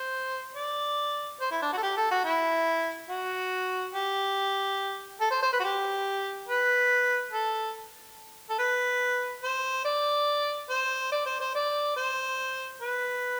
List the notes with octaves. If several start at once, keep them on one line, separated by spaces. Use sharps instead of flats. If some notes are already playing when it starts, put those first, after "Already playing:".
Already playing: C5
D5
C5
E4
D4
F#4
A4
G4
A4
F#4
E4
F#4
G4
A4
C5
C5
B4
F#4
G4
B4
A4
A4
B4
C5
D5
C5
D5
C5
C5
D5
C5
B4